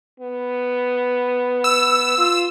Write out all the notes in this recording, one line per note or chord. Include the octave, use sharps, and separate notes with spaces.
B3
E6
F4